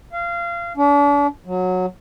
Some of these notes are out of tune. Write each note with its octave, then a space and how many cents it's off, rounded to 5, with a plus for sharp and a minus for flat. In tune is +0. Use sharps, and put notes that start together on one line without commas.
F5 -25
D4 -40
F#3 -15